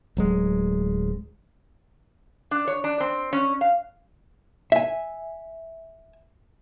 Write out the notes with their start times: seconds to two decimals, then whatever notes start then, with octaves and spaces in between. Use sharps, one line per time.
0.17 D1 F#3 G#3
2.51 D4
2.68 C#5
2.84 D4
3.00 C4
3.33 C#4
3.61 F5
4.72 E5 G#5